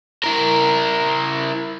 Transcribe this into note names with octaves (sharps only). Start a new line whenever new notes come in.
E4 A#4